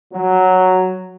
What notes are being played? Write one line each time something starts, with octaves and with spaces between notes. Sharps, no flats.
F#3